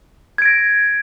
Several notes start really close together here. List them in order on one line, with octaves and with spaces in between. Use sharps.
G#6 D7 A#6